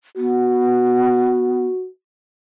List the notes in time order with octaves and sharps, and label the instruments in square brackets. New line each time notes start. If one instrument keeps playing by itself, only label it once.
[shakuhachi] B3 [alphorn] F#4